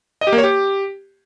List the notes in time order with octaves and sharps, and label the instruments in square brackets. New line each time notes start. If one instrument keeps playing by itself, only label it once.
[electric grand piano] D#5
G4
A#3
C#5
G4